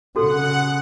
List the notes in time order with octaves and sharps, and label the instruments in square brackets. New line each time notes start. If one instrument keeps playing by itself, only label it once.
[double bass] C#3 [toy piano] F#4 A4 [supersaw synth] F#5